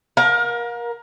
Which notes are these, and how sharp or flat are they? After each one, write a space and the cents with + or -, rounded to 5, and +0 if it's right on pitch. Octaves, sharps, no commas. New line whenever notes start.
A#4 +25 F5 +45